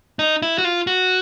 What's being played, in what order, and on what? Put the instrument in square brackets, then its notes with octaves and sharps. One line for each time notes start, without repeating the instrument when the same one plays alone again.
[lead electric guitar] D#4
E4
F#4
F4
F#4